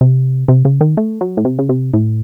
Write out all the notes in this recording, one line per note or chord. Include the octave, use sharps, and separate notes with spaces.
C3
C3
C#3
D#3
A3
F#3
A2
C3
C#3
C3
A2